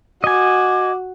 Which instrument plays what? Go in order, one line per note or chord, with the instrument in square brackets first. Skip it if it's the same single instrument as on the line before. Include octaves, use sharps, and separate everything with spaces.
[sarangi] F#4 [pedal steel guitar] D#5 G#5 [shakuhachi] D6